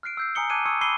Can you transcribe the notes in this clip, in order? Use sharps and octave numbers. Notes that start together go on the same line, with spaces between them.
F6 F#6 C7 D7
E6 G6 C7
G#5 A#5 D#6 C#7 G7
A5 D6 F#6 G#6 C7 D#7
C#6 D#6 E6 G#6 C#7
B5 D6 E6 C7 D#7 G7